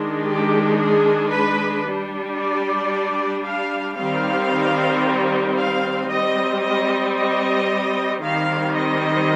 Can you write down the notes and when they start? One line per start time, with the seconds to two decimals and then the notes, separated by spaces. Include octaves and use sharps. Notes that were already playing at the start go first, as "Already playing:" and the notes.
Already playing: D#3 G#3 D4
0.26 G4
0.79 G#4
1.33 B4
1.86 G3 D4
2.38 D5
3.45 F5
3.98 D#3 G3 C4 F5
5.57 F5
6.10 G3 C4 D#5
6.63 D#5
7.17 D#5
8.22 D#3 G3 C4 F5
8.76 D#5